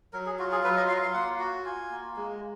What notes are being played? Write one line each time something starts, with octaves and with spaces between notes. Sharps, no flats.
F#3 A#4
G#4
F4 F#4
G#4
F#3 B4
D#5
F4 F5
F5
A#3 F#5
F#4
F4 G#5
A#3
G#3